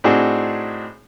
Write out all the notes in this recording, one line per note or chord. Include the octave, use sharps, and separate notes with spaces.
A2 C4 D4 D#4 F#4 G#4